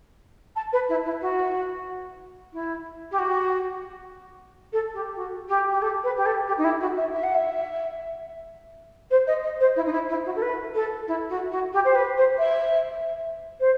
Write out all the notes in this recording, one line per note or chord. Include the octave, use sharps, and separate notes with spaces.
A5
B4
E4
E4
F#4
E4
G4
F#4
A4
G4
F#4
G4
G4
A4
B4
G4
A4
G4
D#4
E4
F#4
E5
E5
F#5
E5
C5
D#5
D#5
C5
E4
D#4
E4
E4
F#4
A4
B4
A4
E4
F#4
F#4
G4
C5
B4
C5
E5
C5